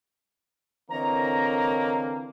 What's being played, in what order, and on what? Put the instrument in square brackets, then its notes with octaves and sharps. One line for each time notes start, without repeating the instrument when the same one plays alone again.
[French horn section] D3 E3 C4 [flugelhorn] A#3 [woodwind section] C#5 D#5 A#5